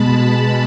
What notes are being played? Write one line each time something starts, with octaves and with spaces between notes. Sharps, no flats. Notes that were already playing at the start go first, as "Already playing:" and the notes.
Already playing: B2 G#3 A5 B5
A5